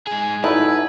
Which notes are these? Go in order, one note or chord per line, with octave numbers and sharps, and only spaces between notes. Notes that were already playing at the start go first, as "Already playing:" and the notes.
G#2 G#4 G#5
F#3 D#4 E4 A4 B4